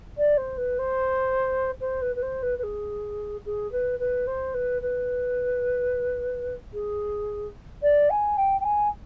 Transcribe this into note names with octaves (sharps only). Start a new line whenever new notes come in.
D5
C5
B4
C5
C5
B4
B4
C5
B4
B4
G#4
G#4
B4
B4
C5
B4
B4
G#4
D5
G#5
G5
G5
G#5